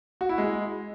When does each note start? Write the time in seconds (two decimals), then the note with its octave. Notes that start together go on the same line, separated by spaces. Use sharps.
0.21 F#4
0.29 E4
0.38 G#3